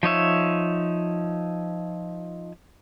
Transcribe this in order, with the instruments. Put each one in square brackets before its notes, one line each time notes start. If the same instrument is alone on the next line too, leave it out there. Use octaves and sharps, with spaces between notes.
[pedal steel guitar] F3 D#4 C#5 E5